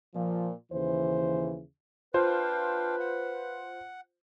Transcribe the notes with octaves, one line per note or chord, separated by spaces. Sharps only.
A#2 F3
D#2 C#3 E3 C5
D4 F4 B4 C5 F5 G5
F#5